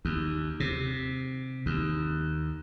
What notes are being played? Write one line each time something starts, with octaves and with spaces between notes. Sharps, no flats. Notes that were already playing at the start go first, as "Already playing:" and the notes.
D#2
C3
D#2